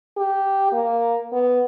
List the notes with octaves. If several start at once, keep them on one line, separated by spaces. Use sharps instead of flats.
G4
A#3
B3